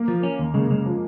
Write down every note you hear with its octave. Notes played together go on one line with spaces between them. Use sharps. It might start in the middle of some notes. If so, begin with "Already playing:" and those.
Already playing: A#3
F3
C#4
D#2
C#3 G#3
C#3 G#3
F3